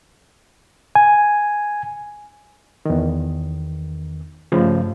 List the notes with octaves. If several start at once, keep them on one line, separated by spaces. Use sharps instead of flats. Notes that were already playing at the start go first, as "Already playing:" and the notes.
G#5
E2 D#3
G2 C#3 F3 A3